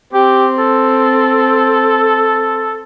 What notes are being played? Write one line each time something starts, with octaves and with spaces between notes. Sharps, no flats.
C4 G4
A4